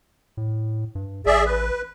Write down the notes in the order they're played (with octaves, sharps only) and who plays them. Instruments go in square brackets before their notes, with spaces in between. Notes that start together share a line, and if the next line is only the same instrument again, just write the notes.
[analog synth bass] A2
G2
[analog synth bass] A1 [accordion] G#4 D5 E5
[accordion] B4